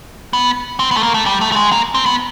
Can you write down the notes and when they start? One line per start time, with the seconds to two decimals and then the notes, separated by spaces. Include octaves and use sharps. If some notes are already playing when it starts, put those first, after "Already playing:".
0.33 B3
0.80 C4
0.91 B3
0.97 A3
1.03 A#3
1.14 A3
1.26 G3
1.41 A3
1.52 A3
1.56 G#3
1.72 A#3
1.95 C4
2.06 B3